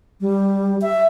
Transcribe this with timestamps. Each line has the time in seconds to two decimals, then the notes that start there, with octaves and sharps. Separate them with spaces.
0.21 G3
0.82 E5